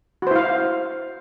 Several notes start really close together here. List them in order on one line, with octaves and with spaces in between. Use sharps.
F#4 C5 E4 F5